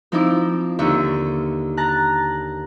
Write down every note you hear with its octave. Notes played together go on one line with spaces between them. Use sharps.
F3 C4 D#4 E4 D6
D#2 D3 E5 C#6
A5 A#5 F#6